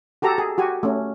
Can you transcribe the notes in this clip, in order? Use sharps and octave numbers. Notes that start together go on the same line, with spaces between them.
F#4 G4 A4 A#5
G#4
F#4 G4 G#5
A3 C#4